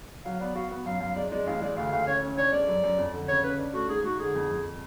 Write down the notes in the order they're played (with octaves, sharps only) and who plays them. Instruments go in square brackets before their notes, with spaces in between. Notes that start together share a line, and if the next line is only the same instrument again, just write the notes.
[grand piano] F#3 [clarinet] F5
[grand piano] B3 [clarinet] D5
[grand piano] F#4 [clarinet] F5
[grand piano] B3
[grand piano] F#2 [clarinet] F5
[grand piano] F#2 [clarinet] F5
[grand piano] G#3 [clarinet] D5
[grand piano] G#3 [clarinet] D5
[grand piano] A1 [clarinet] F5
[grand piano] G#3 [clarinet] D5
[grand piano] D2 [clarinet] F5
[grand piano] D2 [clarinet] F5
[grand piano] C#4 [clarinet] C#5
[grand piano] C#4
[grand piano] D4 [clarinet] C#5
[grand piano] G#3 [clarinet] D5
[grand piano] F#2
F#2
F2
D3
[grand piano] C#3 [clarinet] C#5
[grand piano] C#4 [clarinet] B4
[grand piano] D4
[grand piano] A3 [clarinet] F#4
[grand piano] G#2 [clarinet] G#4
[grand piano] G#2 [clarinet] F#4
[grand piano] D3 [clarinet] G#4
[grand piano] F2
F2